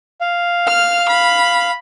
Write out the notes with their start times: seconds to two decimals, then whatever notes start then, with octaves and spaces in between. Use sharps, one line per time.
0.21 F5
0.68 F6
1.09 B5